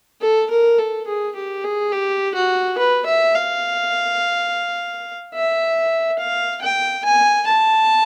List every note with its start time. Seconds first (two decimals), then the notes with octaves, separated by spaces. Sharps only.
0.21 A4
0.51 A#4
0.78 A4
1.07 G#4
1.35 G4
1.64 G#4
1.92 G4
2.35 F#4
2.78 B4
3.06 E5
3.35 F5
5.34 E5
6.19 F5
6.62 G5
7.05 G#5
7.48 A5